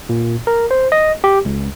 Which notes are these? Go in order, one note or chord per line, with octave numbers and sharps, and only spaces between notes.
A#2
A#4
C5
D#5
G4
C#2